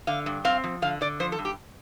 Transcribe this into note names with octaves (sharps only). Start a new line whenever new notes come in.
D3 F5
G2
C4 F5
F3
D3 F5
D3 D5
F3 C5
A4
G2
G4